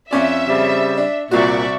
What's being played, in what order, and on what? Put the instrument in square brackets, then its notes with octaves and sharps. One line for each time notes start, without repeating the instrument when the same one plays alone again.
[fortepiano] F2 C#4 D5 [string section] E5
[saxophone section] C#3 G3 C4
[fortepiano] D4
[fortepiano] C2 F#4 [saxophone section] A#2 [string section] D5 E5 C#6